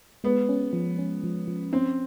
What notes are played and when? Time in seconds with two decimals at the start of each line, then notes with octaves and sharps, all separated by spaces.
0.24 G#3 B3
0.49 C#4
0.73 F3
0.99 C#4
1.23 F3
1.48 F3
1.72 C4 C#4